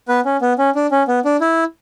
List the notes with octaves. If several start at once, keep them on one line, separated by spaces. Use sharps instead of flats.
B3 B4
C#4
B3
C#4
D4
C#4
B3
D4
E4